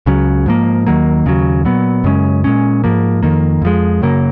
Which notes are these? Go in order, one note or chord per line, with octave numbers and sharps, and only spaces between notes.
C#2 C#3 F#3
G#2 F3 A#3
D#2 D#3 F#3 A#3
D#2 C#3 F#3
A#2 F#3 B3
F#2 C#3 G#3 C#4
A#2 G#3 C#4
G#2 F3 A#3
F2 D#3 A#3
F2 F3 G#3
F#2 C#3 F#3 A#3